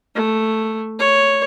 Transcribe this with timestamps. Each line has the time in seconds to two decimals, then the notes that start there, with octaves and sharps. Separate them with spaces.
0.15 A3
0.99 C#5